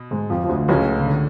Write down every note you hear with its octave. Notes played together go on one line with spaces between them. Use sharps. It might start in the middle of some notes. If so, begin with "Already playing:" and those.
Already playing: B2
G#2 G#3
F2 F3
F3
D2 D3
C#2 A2 C#3 G#3 C#4 F#4
C#3
D3